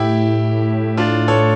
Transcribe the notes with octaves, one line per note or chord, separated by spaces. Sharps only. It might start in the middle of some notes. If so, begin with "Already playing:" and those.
Already playing: A2 E4 G4
D4 F4
A4 C#5